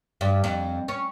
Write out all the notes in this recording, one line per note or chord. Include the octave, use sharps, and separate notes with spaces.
G2
F2
C#4